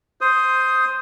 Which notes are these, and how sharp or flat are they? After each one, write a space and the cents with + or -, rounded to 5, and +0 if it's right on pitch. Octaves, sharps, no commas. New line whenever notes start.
C5 +0 D#6 +10